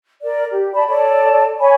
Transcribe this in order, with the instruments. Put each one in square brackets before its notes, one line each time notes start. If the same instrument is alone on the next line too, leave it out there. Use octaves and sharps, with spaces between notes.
[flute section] A#4 D5
G4
D5 A5 B5
A4 C#5 D5 A5
C#5 G#5 B5